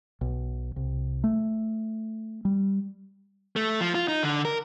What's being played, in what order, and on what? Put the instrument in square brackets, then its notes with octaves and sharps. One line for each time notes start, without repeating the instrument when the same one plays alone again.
[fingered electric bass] B1
C2
A3
G3
[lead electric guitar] A3
F3
F4
D#4
D3
A#4